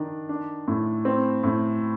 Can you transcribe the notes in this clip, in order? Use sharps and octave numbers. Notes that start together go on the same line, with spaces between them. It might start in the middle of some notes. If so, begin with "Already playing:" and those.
Already playing: D#3 D4
D4
A2
C4
A2